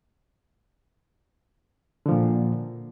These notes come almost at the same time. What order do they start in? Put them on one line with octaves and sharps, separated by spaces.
D3 F3 A#2